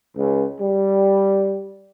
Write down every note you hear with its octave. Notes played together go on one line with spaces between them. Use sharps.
C#2
G3